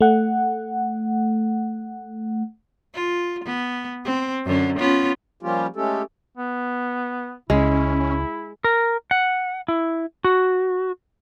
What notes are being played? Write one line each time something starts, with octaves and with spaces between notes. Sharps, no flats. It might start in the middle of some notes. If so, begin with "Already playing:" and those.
A3 F#5
F4
B3
C4
F#2 D3 C#4
B3 C#4 F4
F3 G3 A#3 C#4 F4 G4
G#3 A3 C#4 G4 A4
B3
C#2 G#3 C#4 E4
A#4
F#5
E4
F#4